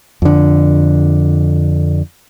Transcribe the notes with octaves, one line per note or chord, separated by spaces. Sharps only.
F2 D3